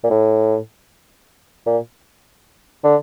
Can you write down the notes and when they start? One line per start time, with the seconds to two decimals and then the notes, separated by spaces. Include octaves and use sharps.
0.04 A#2
0.10 A2
1.66 A#2
2.84 D3